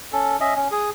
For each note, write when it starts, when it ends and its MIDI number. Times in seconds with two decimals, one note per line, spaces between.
0.13 0.37 61
0.13 0.37 69
0.40 0.54 61
0.40 0.54 75
0.40 0.54 76
0.56 0.68 61
0.71 0.90 68